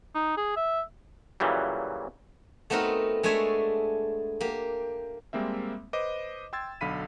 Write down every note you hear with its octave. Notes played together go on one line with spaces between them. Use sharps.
D#4
G#4
E5
A#2 C#3 E3 F#3 G3
A3 B3 C4 D#4 F#4 A#4
G#3 A3 D4 G#4 C#5 E5
A#3 G4
G3 G#3 A#3 C4 E5
B4 C5 D#5 D6
G5 C6 E6 G#6 A6
B1 D3 F5 B5 B6 D#7